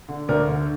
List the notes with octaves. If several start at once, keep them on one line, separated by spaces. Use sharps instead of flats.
D3
D2 A#4 D5
D3